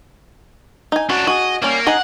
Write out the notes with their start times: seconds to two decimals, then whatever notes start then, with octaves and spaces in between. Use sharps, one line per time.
0.92 D#4 G#5
1.10 C#4 D4 F#4
1.27 F#4 G#4 D#5
1.62 G3 A#3 C#4
1.87 D#4 G#4 D#5 F#5